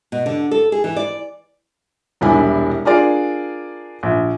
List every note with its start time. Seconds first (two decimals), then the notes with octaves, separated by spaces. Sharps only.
0.12 B2
0.26 D3
0.51 A4
0.72 G#4
0.84 E3
0.96 D5
2.21 E1 C2 G3 D4 E4 G#5
2.85 D4 F4 G#4 A#4 D5
4.03 A#1